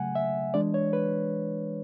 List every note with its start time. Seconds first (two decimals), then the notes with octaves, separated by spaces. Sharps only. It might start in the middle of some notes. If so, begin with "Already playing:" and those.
Already playing: C#3 F#3 A3 F#5 G#5
0.15 E5
0.54 E3 G#3 D4 D5
0.74 C#5
0.93 B4